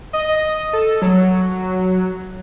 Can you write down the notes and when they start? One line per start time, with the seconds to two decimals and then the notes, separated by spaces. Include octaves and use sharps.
0.13 D#5
0.73 A4
1.02 F#3